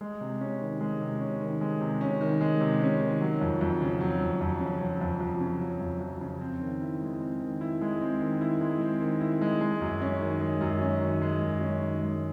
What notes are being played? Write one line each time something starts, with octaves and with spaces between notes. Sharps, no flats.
G#3
C3
C#4
D#3
G#3
C3
C#4
D#3
G#3
C3
C#4
D#3
G#3
C3
C#4
D#3
F#3
F2
F2
C#3
F#3
F2
F2
C#3
F#3
F2
F2
C#3
F#3
F2
F2
C#3
C4
D#3
E4
G#3
C4
D#3
E4
G#3
C4
D#3
E4
G#3
C4
D#3
E4
G#3
G#3
F#2
C#4
D#3
G#3
F#2
C#4
D#3
G#3
F#2
C#4
D#3
G#3